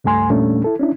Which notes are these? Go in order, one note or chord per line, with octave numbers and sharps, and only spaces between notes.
C#2 G2 A3 G#5 C6
E2 A#2 G3 A3 C#4 D4
E4 A4
C#4 D4 E4